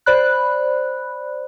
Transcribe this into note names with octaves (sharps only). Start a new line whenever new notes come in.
C5 D5 B5 F#6